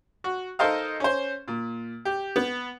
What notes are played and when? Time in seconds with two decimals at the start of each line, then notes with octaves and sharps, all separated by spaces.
0.24 F#4
0.59 D#4 A4 A#4 C5 D#5 F5
1.00 C#4 C5
1.48 A#2
2.05 G4
2.36 B3